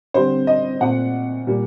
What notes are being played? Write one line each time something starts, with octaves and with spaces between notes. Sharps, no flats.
D3 G3 C4 C5
D#5
A#2 A3 C4 F#5
A#2 G3 A#3